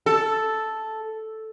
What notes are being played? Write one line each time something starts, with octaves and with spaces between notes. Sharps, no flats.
A4